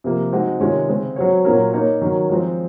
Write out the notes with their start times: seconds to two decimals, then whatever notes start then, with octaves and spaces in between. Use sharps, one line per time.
0.04 C3 F3 A#3
0.33 G#3 C4 D#4 F#4
0.60 C3 D#3 G#3 C#4 F4
0.88 C#3 G#3 C4
1.16 F#3 C4 F#4 C#5
1.45 A#2 F#3 C#4 F#4 A#4
1.73 A#3 D#4 A#4 C#5
2.01 D#3 F#3 C#4
2.30 F3 G#3 C4